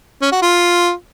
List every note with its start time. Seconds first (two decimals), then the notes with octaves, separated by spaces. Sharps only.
0.22 C#4
0.32 F#4
0.42 F4